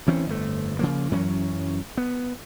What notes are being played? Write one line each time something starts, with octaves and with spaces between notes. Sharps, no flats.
D2 E3 C4 C#4
G1 F2 A3
C#3 F3 A#3
F#2 E3 F#3 C#4
B3